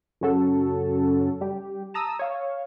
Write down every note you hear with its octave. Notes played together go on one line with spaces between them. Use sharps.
F#2 C#3 C#4 F#4 A4
G3 G4
A5 A#5 D#6 E6
C#5 F5